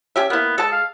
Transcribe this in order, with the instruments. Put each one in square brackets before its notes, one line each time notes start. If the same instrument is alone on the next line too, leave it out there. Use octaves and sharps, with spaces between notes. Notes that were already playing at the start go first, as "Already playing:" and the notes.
[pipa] C#4 G4 E5
[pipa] A#3 E4 [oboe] B3
[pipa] G#3 A5 [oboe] A4
[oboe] F5